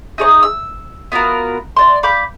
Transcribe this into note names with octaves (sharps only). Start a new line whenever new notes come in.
D#4 G#4 C#5 D#5
E6
B3 F4 F#4 A#4
D5 C6
F5 B5 D6 G6